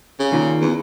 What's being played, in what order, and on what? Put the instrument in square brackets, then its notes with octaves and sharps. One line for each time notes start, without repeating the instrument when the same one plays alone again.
[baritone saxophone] C#3
[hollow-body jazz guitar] D#3 A#3 F4
[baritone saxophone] E2